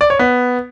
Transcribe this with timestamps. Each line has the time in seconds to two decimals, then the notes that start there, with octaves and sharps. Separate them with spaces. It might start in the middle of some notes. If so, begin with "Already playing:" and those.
0.01 D5
0.10 C#5
0.19 B3